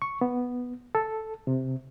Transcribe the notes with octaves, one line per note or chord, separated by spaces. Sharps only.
C#6
B3
A4
C3